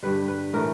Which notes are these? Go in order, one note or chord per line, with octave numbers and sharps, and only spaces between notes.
G2 D3 G3 B4
B4
A2 E3 A3 A#4